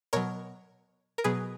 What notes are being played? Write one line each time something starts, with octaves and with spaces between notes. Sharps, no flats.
B2 F#3 A#4 C#5
A#4
B2 F#3 G#4 B4